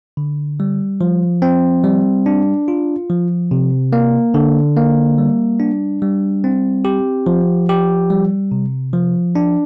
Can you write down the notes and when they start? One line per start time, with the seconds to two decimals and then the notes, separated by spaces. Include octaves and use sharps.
0.17 D3
0.60 G3
1.01 F3
1.42 C4
1.84 G3
2.26 D4
2.68 F4
3.10 F3
3.51 C3
3.93 A#3
4.34 D3
4.77 A#3
5.18 G3
5.60 D4
6.02 G3
6.44 C4
6.85 G4
7.26 F3
7.69 G4
8.10 G3
8.52 C3
8.93 F3
9.35 D4